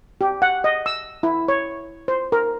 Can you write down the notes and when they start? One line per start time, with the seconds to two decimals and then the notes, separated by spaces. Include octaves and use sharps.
0.21 G4
0.42 F#5
0.64 D#5
0.86 E6
1.23 E4
1.48 C#5
2.08 C5
2.32 A#4